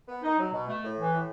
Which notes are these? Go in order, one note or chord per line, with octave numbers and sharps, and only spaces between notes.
B3
D#4
F#3
B2
A3
A2
E3
A2